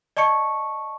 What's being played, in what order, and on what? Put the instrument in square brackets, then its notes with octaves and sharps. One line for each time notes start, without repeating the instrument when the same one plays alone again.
[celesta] D5 D#5 A5 C#6 C#7